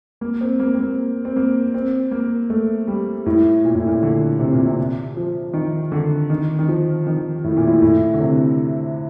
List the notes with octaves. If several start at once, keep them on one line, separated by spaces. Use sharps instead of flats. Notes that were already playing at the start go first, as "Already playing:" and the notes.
A#3
C4
A#3
C4
A#3
C4
A#3
C4
A#3
A3
G3
A2
A#2
A2
A#2
D3
C3
A#2
C3
F3
D#3
D3
D#3
D#3
F3
D#3
A2
A#2
A2
A2
D3
C3